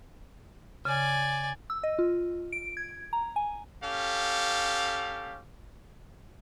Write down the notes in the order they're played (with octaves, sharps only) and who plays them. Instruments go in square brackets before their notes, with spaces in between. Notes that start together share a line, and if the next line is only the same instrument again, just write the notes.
[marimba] C#3 [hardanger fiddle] D5 G#5
[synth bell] E6
D#5
F4
D7
G#6
A#5
G#5
[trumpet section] C#4 G4 A4 F5